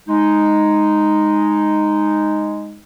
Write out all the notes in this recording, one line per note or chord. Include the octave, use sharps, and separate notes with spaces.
G#3 D#4